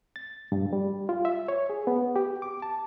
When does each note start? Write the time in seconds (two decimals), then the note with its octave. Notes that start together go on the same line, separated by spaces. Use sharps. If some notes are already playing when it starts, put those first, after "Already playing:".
0.16 A6
0.52 G2
0.73 G3
1.09 F4
1.25 E5
1.48 C#5
1.70 G#4
1.87 B3
2.16 G4
2.42 D6
2.62 A5